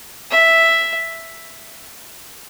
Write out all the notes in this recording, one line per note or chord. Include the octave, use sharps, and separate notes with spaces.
E5